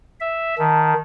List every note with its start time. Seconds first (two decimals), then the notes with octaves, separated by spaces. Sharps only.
0.20 E5
0.59 D#3 A5